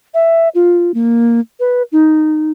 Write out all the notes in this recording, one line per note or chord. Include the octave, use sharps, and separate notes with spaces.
E5
F4
A#3
B4
D#4